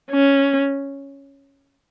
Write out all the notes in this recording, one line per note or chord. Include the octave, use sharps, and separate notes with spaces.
C#4